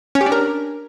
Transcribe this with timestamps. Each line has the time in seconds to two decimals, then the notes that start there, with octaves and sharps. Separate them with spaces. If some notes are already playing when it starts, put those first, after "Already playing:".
0.15 C#4
0.21 G4
0.26 D4
0.32 A#4